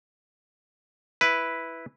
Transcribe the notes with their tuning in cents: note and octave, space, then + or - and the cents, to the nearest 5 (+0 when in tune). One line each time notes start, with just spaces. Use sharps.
E4 +0 B4 +0